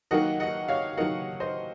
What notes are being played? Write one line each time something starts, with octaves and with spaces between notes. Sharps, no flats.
D#3 F#3 A#3 D#4 D#5 F#5
D#5 F#5
C#5 F5
D#3 F#3 A#3 D#4 D#5 F#5
C5 D#5